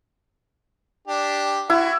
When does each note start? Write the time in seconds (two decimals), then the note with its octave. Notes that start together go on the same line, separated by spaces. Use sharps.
1.07 D4 G4
1.70 E4 F#4